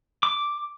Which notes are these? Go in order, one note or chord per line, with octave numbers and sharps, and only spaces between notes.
D6